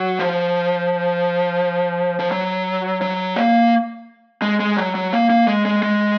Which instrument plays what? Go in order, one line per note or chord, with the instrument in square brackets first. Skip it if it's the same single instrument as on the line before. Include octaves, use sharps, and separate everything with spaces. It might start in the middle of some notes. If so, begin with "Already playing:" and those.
Already playing: [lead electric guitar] F#3
F3
F3
F#3
F#3
A#3
G#3
G#3
F#3
F#3
A#3
A#3
G#3
G#3
G#3